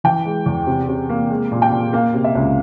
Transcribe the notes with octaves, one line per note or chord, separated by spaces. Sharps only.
E3 G5
G#3
E2
C3
C3
A#3
G#3
A#2
G5
A#2
A#3 F5
C3
E5
C#2